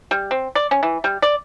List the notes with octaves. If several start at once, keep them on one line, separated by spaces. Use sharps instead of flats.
G3
C4
D5
C#4
E3
G3
D5